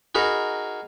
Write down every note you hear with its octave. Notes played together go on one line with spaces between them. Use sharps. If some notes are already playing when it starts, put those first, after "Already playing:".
D#4 F#4 G#4 A#4 B5